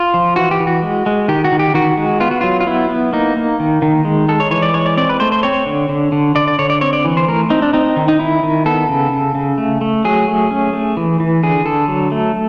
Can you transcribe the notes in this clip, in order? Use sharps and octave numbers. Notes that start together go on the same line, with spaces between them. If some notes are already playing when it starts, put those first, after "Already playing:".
Already playing: F4
F3
E3 F#4
G4
E3
F#4
G#3
G#3
D#3 G4
F#4
D#3
G4
D#3 F#4
G#3
B3 F4
F#4
F#3 F4
F4
B3 E4
B3
A#3 D#4
A#3
D#3
D#3
G#3
G#3 A4
C#5
E3 C#5
D5
G#3 C#5
D5
C4 D5
B4
A3 C5
C5
C4 C#5
D3
D3
D3
D3 D5
D5
D3 C#5
D5
C4 C#5
D5
E3
C5
A3 A#4
C4 D#4
D4
C4 D#4
D#3
D#4
D#3 E4
D#3
B3 A4
C#3
C#3
C#3
A3
A3
F#3 G#4
A3
C#4
A3
E3
E3
D3 G#4
D3 A4
F#3
A3